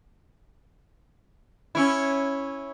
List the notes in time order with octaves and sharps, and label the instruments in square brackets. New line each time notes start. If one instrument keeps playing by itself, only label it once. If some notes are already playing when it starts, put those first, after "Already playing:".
[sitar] C#4 E4